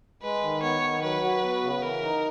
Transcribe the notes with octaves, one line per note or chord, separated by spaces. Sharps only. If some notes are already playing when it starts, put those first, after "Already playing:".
G#3 B4
D#3
B3 C#5
D#3
F#3 B4
F#4
B3
C#3
E3 A#4
D#4